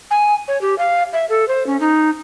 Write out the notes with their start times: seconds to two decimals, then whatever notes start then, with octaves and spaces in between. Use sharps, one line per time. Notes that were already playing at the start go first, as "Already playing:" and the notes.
0.11 G#5
0.48 C#5
0.61 G4
0.78 F5
1.13 E5
1.30 A4
1.48 C5
1.67 C#4
1.80 D#4